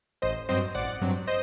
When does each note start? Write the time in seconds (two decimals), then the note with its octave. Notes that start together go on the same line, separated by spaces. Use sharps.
0.22 A1 C5 D#5
0.49 G2 F#3 C4 C5 D#5
0.75 A1 D5 F#5
1.01 G2 F#3 C4
1.27 C5 D#5